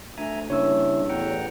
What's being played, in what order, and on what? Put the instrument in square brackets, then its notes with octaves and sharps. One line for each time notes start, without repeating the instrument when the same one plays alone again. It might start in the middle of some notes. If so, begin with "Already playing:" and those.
[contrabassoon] D2 [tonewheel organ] E5 G#5 A#5
[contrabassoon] G2 [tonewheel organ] C#3 C#4 E4 [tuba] A#3 [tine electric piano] C#5 E6
[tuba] A1 [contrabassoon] E2 [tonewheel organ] F#5 G5 A#5